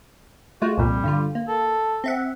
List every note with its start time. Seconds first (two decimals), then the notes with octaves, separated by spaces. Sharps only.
0.62 G#3 A3 F4 F#4
0.78 C2 F2 A#2 G3
1.04 G2 D3 F4
1.35 A#3
1.48 A4
2.04 C4 E5 F#5